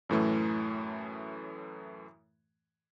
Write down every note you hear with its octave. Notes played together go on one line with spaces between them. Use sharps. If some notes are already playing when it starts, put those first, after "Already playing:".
F#2 A2 E3 A3